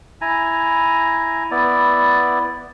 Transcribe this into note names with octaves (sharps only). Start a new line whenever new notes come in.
E4 G#5 A#5
B3 E4 D5